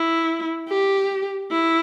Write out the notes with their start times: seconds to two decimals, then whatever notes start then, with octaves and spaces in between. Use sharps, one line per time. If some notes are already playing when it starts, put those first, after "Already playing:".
Already playing: E4
0.69 G4
1.51 E4